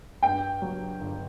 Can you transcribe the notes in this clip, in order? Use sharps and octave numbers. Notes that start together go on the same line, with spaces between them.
G2 G5
F#3
G1